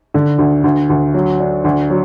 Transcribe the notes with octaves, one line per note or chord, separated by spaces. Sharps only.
D3
D2
D2
D2
F#3
D4
D2
F#3